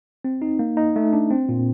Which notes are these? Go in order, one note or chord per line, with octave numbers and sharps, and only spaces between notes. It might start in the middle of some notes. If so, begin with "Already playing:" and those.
C4
D#4
A#3
D#4
A3
D4
C4
A#2